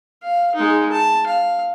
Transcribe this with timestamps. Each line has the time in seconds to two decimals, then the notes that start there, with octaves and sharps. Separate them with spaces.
0.23 F5
0.55 G#3 D#4
0.92 A5
1.26 F5